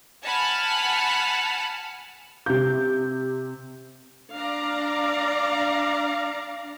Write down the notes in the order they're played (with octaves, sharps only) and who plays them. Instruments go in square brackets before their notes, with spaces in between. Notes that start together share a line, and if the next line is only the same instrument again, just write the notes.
[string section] F#5 G#5 A5 B5 F6
[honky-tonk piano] C3 G6
[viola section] D4 D5 F5 A#5